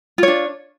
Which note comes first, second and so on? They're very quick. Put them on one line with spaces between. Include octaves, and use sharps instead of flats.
F4 C#5 D4